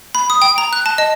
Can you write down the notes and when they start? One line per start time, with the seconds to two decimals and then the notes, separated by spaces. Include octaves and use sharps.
0.15 B5
0.30 D#6
0.42 G5
0.58 A#5
0.73 F#6
0.86 A5
0.98 D#5